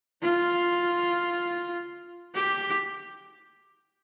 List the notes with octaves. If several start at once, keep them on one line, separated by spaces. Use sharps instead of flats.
F4
G4